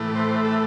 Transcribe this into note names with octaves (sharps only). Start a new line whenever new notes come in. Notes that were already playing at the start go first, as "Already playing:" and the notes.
Already playing: A2 E3 A3
C5
A4